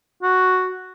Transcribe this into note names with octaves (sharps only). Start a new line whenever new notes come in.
F#4